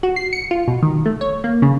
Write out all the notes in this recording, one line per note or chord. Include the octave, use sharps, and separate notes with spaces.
F#4
C7
C#7
F4
B2
D#3
A3
C#5
A#3
C#3